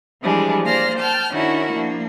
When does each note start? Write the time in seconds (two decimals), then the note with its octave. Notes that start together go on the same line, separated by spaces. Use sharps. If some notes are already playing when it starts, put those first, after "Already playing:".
0.22 E3 F3 G3 G#3 D4
0.65 A#3 C5 D5 F5 F6 A#6
0.97 G5 A5 F6 G6
1.32 D#3 C#4 D4 E4 F#4 A#4
1.72 F3 A#3 D4